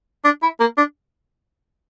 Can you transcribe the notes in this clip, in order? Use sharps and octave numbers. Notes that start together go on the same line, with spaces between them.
D4
E4
A#3
D4